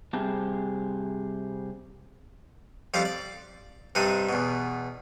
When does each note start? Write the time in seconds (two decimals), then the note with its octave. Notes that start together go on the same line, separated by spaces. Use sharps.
0.13 C3 G3 C4 G4 G#4 A5
2.94 F2 G3 F4 F5 D6
3.05 D5
3.95 G2 C3 D4 D#4 D#6
4.29 E2 B2